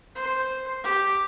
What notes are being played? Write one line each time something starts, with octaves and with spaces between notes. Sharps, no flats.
C5
G4